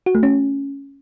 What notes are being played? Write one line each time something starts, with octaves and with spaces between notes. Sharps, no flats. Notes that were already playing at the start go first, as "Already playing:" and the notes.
F#4
A3
C#4